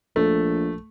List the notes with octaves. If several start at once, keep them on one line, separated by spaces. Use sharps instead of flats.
A#1 A3